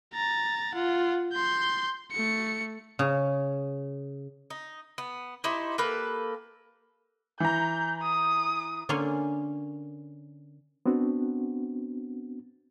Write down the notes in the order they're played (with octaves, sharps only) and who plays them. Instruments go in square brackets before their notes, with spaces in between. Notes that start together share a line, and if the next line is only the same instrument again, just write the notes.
[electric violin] A#5 A6
F4 F#5
C6 G6
A3 C#7
[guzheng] C#3
[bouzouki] D#4
B3
D#4 E4 G4 C5
A#3 G4 A4 B4
[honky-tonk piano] E3 A#5 [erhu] G6
[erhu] D#6
[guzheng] D3 A#3 C#4 D4 G#5 C6
[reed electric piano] B3 C4 D4 F#4